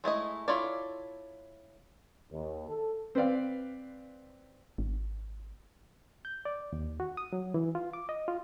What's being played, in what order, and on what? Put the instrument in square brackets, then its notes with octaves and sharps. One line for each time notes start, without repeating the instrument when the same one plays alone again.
[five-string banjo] G#3 A3 E4 D#5
E4 F4 A4 C#5 D5
[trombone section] D#2
A4
[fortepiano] C4 B4 D5 F5
[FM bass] G#1
[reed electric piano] G6
D5
D#2
F#4
D#6
F#3
E3
F4
D6
D#5
F4